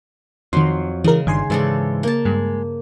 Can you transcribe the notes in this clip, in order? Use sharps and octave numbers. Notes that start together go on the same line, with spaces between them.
F2 D#3 F#3 C6
C#3 E3 G#3 A#4
G1 G2 D#3 G#5 C6
G#2 C#3 E3 G#3 A4 D5
A#3 A5
G2 G#3